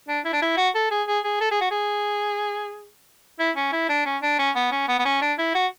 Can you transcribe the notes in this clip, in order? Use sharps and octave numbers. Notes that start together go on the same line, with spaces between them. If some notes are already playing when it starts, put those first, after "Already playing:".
D4
E4
D4
E4
F#4
A4
G#4
G#4
G#4
A4
G#4
F#4
G#4
E4
C#4
E4
D4
C#4
D4
C#4
B3
C#4
B3
B3
C#4
D4
E4
F#4